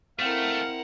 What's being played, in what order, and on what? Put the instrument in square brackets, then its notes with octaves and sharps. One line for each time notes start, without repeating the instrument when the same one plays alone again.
[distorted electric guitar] A3 [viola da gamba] C4 E4 [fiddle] A#4 F#5 [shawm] F5